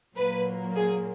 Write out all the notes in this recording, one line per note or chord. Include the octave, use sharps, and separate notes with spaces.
A#2 F#3 A#3 B4
G#4